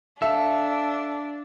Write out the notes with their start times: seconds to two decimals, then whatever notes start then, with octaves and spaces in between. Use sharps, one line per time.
0.22 D4 A4 E5 F5 E6